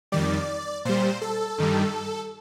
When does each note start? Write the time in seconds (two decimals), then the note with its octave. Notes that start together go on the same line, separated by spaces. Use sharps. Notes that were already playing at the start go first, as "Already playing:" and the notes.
0.12 F2 D#3 G3 D5
0.85 A#2 G3 C5
1.22 A4
1.58 G2 D#3 G3